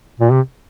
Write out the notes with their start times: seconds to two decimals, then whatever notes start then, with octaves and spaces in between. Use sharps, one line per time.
0.20 A#2
0.32 C3